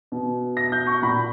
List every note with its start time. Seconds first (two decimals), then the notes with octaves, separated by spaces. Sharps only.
0.12 B2
0.57 A#6
0.72 G6
0.87 C#6
1.02 A#2 B5